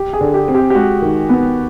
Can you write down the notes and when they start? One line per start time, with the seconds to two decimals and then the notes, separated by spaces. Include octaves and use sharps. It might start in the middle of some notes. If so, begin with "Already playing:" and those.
Already playing: G4
0.13 G#4
0.21 D3
0.34 G4
0.48 C4
0.54 G4
0.70 G4
0.75 G#3 F#4
1.02 D#3
1.29 B3